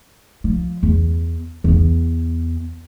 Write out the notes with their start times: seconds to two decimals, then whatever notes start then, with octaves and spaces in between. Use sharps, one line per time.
0.44 F3
0.83 E2
1.64 E2 B3